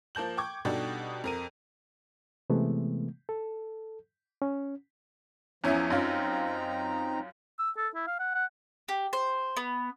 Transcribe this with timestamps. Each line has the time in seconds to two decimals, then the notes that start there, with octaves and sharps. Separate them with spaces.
0.15 F3 A#3 A5 G6 F#7
0.37 G5 C#6 D6 G#6
0.65 B2 G3 D4 D#4 G4 A4
1.24 F2 A#4 D#7
2.50 C3 E3 G#3 A3 B3
3.29 A4
4.42 C#4
5.64 E2 F3 C#4 E4
5.90 F#2 C4 C#4 D#4 F4 A#5
7.59 E6
7.77 A4
7.95 E4
8.07 F5
8.19 F#5
8.35 F#5
8.88 G4
9.13 C5
9.57 B3